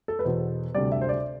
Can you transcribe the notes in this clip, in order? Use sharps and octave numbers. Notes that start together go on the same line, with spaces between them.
A4
B4
E2 B2 B3 C5
D2 C3 G3 D5
E5
C5
D5